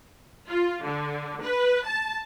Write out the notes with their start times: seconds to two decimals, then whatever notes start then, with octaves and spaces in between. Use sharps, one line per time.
0.48 F4
0.85 D3
1.43 B4
1.86 A5